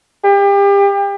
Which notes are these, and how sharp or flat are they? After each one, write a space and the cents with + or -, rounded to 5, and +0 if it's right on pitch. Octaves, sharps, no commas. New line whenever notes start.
G4 +35